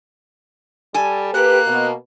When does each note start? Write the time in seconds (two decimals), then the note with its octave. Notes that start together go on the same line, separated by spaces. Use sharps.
0.94 G3 A4 G#5
1.33 A#3 G4 B4 F#6
1.66 B2